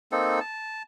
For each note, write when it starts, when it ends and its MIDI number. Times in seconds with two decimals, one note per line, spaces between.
0.12 0.39 58
0.12 0.39 60
0.12 0.39 63
0.12 0.39 69
0.40 0.83 81